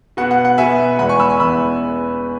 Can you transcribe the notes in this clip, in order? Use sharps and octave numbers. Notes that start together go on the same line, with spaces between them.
B2 B3 F#5
F#5
F#5
B2 B3 E5 G#5
E2 E3 G#3 B3 F#5 B5
G#5 C#6
B5 E6
G#5 C#6
E2 E3 G#3 B3 B5 E6